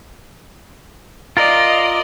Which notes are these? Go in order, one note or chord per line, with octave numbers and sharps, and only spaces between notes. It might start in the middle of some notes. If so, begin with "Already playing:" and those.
F4 A#4 D5 D#5